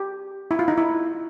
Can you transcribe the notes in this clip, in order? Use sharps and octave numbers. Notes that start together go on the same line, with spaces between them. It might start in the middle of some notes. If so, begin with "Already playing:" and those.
Already playing: G4
E4
F4
D#4
E4